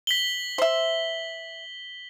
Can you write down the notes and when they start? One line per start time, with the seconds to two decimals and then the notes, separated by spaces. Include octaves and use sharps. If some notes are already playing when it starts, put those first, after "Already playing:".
0.07 B6 F#7 G7
0.58 C5 E5